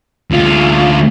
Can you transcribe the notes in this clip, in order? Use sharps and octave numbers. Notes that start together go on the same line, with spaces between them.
D2 F4